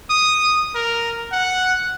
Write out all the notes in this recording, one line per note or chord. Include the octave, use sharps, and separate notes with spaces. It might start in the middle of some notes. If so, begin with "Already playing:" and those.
D#6
A#4
F#5